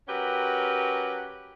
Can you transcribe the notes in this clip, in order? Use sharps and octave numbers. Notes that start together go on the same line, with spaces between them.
F#3 C#4 G4 A#4 B4